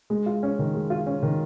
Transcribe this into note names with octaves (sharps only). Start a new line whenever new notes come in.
G#3
F4
C#4
D#3
G#3
F4
C#4
D#3